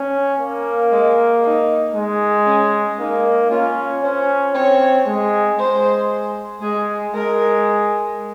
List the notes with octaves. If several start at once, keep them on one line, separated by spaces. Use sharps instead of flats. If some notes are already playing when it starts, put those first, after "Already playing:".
Already playing: C#4
A#3
G#3
D#4
G#3
C#4
A#3 D#4
C#4 F4
C#4 C5
C4 C#5
G#3
G#3 C5
G#3 G#4
G#3 A#4